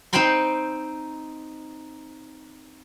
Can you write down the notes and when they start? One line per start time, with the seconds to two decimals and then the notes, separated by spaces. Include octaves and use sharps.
0.13 C4 D#4 C5 G5 B5 C6